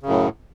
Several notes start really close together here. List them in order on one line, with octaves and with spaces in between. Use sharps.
C#3 F#2 A2